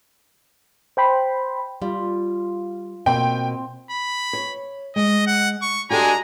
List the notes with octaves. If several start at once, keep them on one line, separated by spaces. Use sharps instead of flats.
C5 G5 B5 C6
G3 F4
B2 A#3 C4 G5
B5
C#5
G#3 D#5
F#5
C#6
G#3 D4 F#4 G4 A4 G#5 A#5